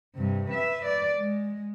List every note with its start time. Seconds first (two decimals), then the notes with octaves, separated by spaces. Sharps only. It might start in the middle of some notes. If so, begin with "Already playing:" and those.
0.15 G2 C3
0.50 B4 E5
0.86 D5
1.17 G#3